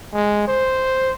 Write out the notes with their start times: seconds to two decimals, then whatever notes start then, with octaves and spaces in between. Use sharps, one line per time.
0.13 G#3
0.48 C5